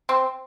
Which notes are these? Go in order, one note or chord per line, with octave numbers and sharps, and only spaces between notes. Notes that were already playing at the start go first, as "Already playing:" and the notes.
C4